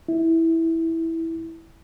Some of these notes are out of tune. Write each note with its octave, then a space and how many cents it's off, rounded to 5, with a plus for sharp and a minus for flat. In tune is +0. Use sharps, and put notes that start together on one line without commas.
E4 -10